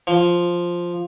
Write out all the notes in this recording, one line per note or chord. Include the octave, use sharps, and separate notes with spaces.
F3